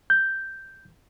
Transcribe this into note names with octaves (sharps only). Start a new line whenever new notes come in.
G6